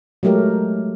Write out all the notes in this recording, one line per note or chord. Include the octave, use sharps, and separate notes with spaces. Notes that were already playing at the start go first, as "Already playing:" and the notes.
F#3 G#3 A3 G4 A#4